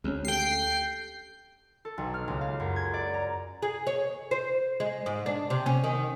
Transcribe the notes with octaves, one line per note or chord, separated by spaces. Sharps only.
D2 G#3 C4 C#4
G4 A4 G5 C7
A4
B1
F6
C#2
F5
F#2
G#6
D5
A#5
G#4
C#5
C5
G#3
G#2
D4
C3
C#4
D#3